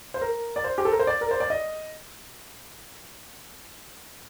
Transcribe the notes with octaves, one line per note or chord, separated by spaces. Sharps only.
C5
A#4
D5
C5
G4
A4
A#4
C5
D5
A#4
C5
D5
D#5